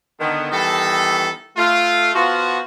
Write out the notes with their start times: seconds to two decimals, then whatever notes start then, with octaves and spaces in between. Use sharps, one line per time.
0.20 D3 D#3 B3
0.51 D#3 E3 G3 B3 A4
1.56 A3 F4
2.15 F3 B3 F4 F#4